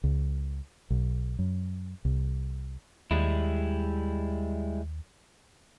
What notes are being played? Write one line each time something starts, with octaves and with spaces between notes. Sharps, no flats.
C#2
B1
F#2
C2
D#2 G3 G#3 E4